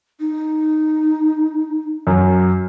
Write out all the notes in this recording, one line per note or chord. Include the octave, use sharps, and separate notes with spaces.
D#4
F#2